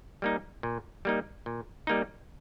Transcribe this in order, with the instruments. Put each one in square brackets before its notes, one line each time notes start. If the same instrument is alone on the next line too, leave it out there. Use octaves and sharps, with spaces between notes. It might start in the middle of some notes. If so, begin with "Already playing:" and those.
[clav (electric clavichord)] G3 A#3 D#4
A#2
G3 A#3 D#4
A#2
G3 A#3 D#4